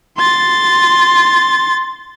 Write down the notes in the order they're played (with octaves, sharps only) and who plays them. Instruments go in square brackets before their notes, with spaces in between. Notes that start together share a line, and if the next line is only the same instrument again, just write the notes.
[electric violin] C6 A6